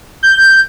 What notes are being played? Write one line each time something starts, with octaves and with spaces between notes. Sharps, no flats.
G6